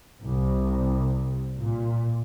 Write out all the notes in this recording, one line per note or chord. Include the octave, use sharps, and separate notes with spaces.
C2
A#2